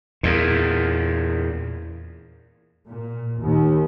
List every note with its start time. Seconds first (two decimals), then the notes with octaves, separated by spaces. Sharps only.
0.23 E2 A#2
2.88 A#2
3.40 D#2